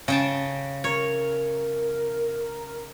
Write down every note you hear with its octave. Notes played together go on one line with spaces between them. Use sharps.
C#3 G5 A5
A#4 C#5